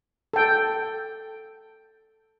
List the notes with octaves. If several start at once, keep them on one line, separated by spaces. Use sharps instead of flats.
A4 G5